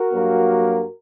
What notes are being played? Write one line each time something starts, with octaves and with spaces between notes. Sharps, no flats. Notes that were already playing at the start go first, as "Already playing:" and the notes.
Already playing: F#4 A#4
G2 F#3 A#3